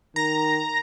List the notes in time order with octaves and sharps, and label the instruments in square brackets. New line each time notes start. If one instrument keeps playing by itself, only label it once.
[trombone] D#3 [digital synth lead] A#5